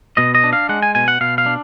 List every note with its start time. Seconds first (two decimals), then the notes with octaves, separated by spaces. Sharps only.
0.17 B2 D#5
0.35 D#5
0.44 D4
0.53 F5
0.69 G#3 F#5
0.83 G#5
0.95 B2 G#5
1.08 F#5
1.21 B2 F5
1.38 F5
1.46 D4